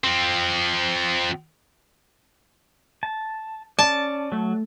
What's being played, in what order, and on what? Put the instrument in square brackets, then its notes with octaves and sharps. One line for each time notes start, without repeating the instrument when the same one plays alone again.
[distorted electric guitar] F3 C4
[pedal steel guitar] A5
[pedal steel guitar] C#4 D5 [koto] A5
[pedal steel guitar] F#3 [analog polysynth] A3